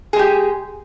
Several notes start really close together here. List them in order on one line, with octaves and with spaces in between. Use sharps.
G#4 G#3 G4